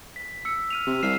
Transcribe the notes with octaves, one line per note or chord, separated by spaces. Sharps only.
B6
E6 C#7
F6 D#7 F7
C3
C2 F6 C7 E7